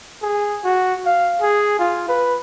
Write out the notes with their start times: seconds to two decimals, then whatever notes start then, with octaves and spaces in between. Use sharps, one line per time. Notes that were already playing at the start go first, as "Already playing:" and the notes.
0.22 G#4
0.64 F#4
1.06 F5
1.41 G#4
1.79 F4
2.09 B4